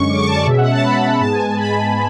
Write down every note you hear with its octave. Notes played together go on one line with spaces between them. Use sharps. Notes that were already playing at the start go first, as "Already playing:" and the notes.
Already playing: F#2 D3 G#3 C#4 C#6
D6
C#6
A5
D5
B2 G#3 C#4 E5
F#5
A5
B5
G#2 G#3 B3 A5
G#5
A5
B5